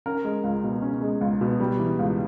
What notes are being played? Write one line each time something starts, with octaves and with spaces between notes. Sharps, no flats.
C#4 A#4
G#3
C#2
B2
C#4
G#3
C#2
B2
G3
E3
C#2